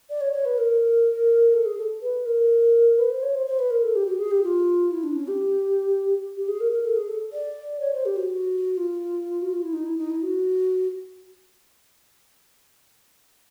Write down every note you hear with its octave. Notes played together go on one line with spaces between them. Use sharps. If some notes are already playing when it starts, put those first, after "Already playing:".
D5
C#5
C#5
B4
A#4
A4
G#4
A4
B4
A#4
B4
C5
C#5
C5
C5
B4
A#4
A4
G4
F#4
G#4
G4
F4
E4
D4
C#4
G4
G4
G#4
A#4
A#4
A4
G#4
A4
D5
C#5
C5
G4
F#4
F4
F#4
F4
E4
D#4
E4
D#4
E4
F#4